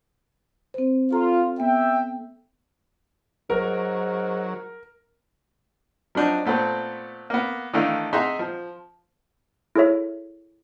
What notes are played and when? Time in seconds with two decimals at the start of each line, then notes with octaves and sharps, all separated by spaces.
0.74 C4 C5
1.12 F4 A4 A#5
1.60 B3 E5 G5
3.50 G#2 F#3 A#4
6.15 F3 F#3 D4 D#4
6.45 A#2 A3 B3 C4
7.30 A#3 B3
7.73 D#3 E3 A3 D4 E4 F5
8.13 D#4 G#4 E5 F#5 A#5 C6
8.39 F3
9.75 E4 G#4 A4 C#5 E5